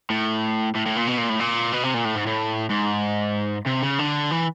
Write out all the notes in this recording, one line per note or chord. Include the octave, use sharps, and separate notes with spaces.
A2
A2
A2
A#2
B2
A#2
A2
A#2
B2
C3
A#2
A2
G#2
A2
G#2
C3
C#3
D3
E3